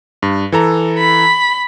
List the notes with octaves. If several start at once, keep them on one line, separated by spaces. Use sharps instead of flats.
G2
E3 A4 A#5
B5